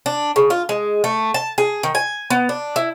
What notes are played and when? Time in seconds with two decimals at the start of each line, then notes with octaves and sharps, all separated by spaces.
0.06 D4
0.36 C#3
0.50 F4
0.69 G#3
1.04 A3
1.34 A5
1.58 G#4
1.83 D#3
1.95 G#5
2.30 B3
2.49 D4
2.76 E4